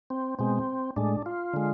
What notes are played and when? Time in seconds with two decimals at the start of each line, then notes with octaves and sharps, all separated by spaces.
0.10 C4
0.39 B2 G#3 C4
0.96 A2 G#3 D4
1.26 F4
1.53 D3 G#3